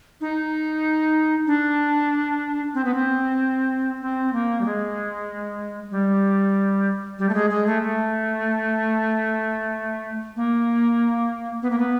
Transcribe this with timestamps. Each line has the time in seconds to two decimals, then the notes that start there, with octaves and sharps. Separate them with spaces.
0.21 D#4
1.47 D4
2.74 C4
2.85 B3
2.94 C4
4.02 C4
4.33 A#3
4.61 G3
4.65 G#3
5.91 G3
7.19 G3
7.29 A3
7.34 G#3
7.50 G#3
7.67 A3
7.82 A3
10.36 A#3
11.62 B3
11.70 A#3
11.79 B3